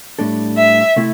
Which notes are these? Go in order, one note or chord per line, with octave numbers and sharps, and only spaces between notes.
A2 G3 D4 A4
E5
C3 A3 E4